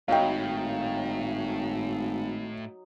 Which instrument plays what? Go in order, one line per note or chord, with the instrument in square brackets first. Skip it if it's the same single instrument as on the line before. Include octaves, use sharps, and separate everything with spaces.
[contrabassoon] G#1 [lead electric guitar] A2 [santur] F#3 D#4 [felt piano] F5 G5